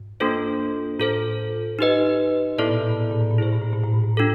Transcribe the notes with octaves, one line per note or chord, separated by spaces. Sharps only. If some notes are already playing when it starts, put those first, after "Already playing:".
Already playing: G#2
A#3 D4 F4 A4 C5
A2 F4 A4 C5
D#4 G4 B4 D#5
A2 B3 E4 A4 D5
A#2
A2
A#2
A2
A#2
A2
A#2
A2 E4 G#4 C5
A#2
A2
A#2
A2
A#2
A2
D4 F4 A4